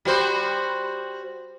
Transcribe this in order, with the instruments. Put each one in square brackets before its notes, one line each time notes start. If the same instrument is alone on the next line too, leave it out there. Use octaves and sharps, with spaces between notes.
[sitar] G3 F#4 C5